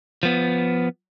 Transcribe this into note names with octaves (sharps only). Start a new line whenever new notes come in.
F3 B3